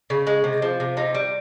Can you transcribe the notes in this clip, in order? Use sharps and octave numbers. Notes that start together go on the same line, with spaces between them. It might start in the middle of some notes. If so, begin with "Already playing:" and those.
C#3
G#3
C3
F3
C3
C3 D#4
G3